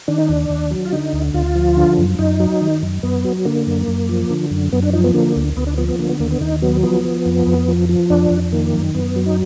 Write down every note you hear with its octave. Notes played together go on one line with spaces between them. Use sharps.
D#3 D4
D#4
D#2 D4
D#2
F#3
F4
D3 D#4
D2
D2 F4
F3
D3
F#2
F#2 D#4
F#3
D#3
F#2
F#2 B3
F#3
D3 A#3
F#2
F#2
F3
D3
F#2
F#2 B3
D4
F3 D#4
B3
D3 A#3
D2
D2 B3
D4
F3 B3
B3
D3 A#3
B3
D#2 A#3
B3
D#2 D#4
F#3 B3
F3 B3
F3
F2
F2
F3
F3
F2 D4
F2
D#3 A#3
F#2
F#2 B3
F#3
D#4